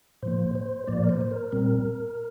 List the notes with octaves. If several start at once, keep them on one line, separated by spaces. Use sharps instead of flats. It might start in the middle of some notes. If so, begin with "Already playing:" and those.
A2 F3 A#3 C5
C5
A2 F3 A#3 D5
A#4
C5
C5
A#4
A#2 G3 C4